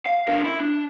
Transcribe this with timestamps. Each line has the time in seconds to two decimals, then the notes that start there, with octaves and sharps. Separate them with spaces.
0.06 F5
0.28 D4 A#4
0.44 E4
0.60 D4